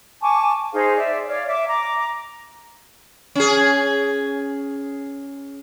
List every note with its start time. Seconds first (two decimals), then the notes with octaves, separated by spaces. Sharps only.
0.21 G#5 A5 C#6 D6
0.73 D#4 G#4 C5 F5
0.97 D5 E5
1.27 C#5 D5 F5
1.48 E5 D6
1.68 A#5 D6
3.35 C#4 G#4